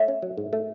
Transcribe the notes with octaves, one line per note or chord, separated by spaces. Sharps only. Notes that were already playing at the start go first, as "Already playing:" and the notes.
Already playing: A3 C#5 E5
C#4
F#3
G#2
A3